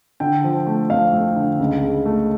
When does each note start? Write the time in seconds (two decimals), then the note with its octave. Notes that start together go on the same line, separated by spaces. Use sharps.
0.20 D3 G5
0.44 F3
0.67 A3
0.90 F2 F5
1.13 A3
1.36 D3
1.59 C#2
1.83 C#3
2.06 A3